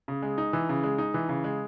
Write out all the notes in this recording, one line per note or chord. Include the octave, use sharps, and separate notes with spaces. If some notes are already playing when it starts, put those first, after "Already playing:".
C#3
G#3
D#4
E3
C#3
G#3
D#4
E3
C#3
G#3